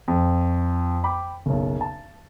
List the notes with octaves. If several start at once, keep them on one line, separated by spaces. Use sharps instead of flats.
F2
G5 B5 D6
F#1 B1
A5